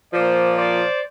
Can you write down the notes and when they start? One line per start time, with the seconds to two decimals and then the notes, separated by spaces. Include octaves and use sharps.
0.13 A#2 F3 C5 D5
0.56 C5 D5